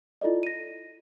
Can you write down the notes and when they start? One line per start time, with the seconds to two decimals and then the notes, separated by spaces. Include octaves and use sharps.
0.21 E4 F4 A4 D5 D#5
0.43 A#6 D#7